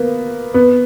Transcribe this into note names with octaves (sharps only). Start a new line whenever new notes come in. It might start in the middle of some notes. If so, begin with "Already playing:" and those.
Already playing: A#3 B3
B3